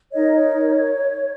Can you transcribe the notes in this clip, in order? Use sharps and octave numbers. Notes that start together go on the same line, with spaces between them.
D#4 A#4 C#5 D#5
C#5